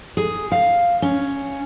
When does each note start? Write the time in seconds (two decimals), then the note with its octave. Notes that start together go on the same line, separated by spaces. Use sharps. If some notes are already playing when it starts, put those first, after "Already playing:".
0.17 G#4
0.52 F5
1.02 C#4